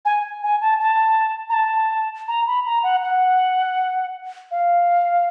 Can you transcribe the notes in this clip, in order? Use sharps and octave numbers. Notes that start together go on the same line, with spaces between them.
G#5
G#5
A5
A5
A#5
A5
A#5
B5
A#5
F#5
F#5
F5